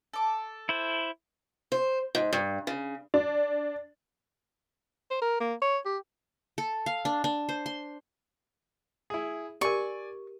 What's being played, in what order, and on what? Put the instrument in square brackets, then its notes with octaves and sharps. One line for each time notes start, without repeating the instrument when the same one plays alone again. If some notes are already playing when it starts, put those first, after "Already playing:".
[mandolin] A4 D6
[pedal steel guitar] E4 C5
[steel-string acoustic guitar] C5
G#2
G2
C#3
[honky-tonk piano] D4
[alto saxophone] C5
A#4
A#3
C#5
G4
[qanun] A4
F5
D4
D4
C5
C6
[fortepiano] E4 G#4
[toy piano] G4 A#4 [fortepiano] D5 G#5 [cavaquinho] C#6